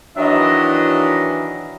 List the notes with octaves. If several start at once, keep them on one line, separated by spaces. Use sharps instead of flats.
D#3 E3 F#3 D4 E4 D#5